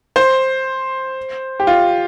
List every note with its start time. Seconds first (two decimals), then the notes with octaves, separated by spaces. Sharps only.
0.16 C5
1.60 G4
1.67 F4